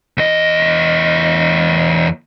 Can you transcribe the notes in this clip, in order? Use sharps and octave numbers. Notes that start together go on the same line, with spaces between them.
E2 D#5